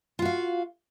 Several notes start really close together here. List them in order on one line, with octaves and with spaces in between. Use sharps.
F4 F#4 F5